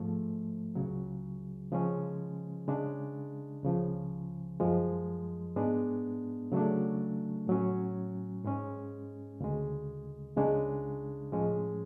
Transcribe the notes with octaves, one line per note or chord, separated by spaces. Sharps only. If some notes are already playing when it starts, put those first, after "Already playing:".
Already playing: G#2 F3 A3
C#2 C#3 F#3
C#3 F3 G#3 C#4
C#3 G#3 D4
C#2 C#3 F3
F#2 F3 G#3
G#2 G#3 B3 D4
C#3 F#3 A3 D4
A2 F#3 C#4
G#2 G#3 C#4
D2 C#3 G#3
C#2 C#3 G#3 D4
A2 F3 G#3 C#4